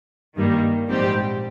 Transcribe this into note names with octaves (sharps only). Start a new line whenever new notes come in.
G2 D#3 G3 A#3
A#1 G#2 G3 C4 G4